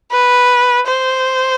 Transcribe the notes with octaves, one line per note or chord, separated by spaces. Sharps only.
B4
C5